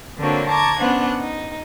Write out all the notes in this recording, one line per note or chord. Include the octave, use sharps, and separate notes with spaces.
D3 A#3 C4 D4 F#4 C#5
A5 A#5 C#6 D6 G#6
B3 C#4 D4 C5 F#5
D#4